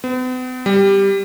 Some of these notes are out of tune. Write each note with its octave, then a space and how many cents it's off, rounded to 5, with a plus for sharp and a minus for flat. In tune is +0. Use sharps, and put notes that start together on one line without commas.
B3 +45
G3 +5